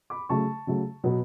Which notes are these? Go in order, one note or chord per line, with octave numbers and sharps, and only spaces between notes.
B5 D6
C#3 F#3 A3 A5 C#6
C#3 F#3 A3
B2 F#3 B3